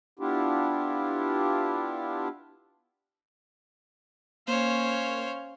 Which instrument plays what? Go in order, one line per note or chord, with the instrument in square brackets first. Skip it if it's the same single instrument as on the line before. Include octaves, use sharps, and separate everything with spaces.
[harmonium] B3 D4 E4 F4 G4
[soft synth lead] A#3 [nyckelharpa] C#4 F5 [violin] C5 C#5